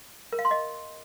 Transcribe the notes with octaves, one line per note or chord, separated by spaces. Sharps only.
A#4
F5
C6
D#5